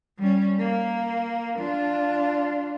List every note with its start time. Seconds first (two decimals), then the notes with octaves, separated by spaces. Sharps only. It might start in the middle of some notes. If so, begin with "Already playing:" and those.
0.18 G3 C#4
0.59 A#3
1.59 D4 F4